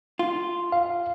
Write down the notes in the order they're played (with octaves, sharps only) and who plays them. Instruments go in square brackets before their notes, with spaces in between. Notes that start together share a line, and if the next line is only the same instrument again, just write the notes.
[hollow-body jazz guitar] F4
[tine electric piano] F5